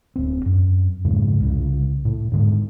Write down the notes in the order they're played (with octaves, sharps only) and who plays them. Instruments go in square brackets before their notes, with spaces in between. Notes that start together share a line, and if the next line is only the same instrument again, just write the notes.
[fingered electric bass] D1 C4
F#2
F2 G#2 C#3 G#3
C2 C#3
A2
G#2 D3 F3 G#3